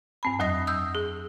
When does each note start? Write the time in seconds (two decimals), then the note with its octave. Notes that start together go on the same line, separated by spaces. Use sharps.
0.23 G2 C4 B5
0.39 F2 F#3 D#5 D#6 A#6
0.67 D#6 E6 G6
0.95 G#4